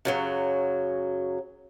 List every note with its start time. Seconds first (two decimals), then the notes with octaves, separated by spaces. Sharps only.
0.05 F#2 C#3 F#3